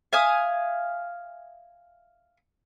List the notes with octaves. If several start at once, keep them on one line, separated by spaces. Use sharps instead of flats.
E5 F5 G#5 D#6